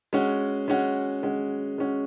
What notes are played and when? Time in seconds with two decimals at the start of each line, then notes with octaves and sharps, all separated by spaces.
0.13 G#3 C#4 F#4
0.68 G#3 C#4 F#4
1.23 G#3 C#4 F#4
1.78 G#3 C#4 F#4